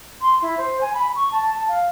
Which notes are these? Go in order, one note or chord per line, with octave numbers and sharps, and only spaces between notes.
C6
E4
C5
G#5
B5
C#6
A5
F5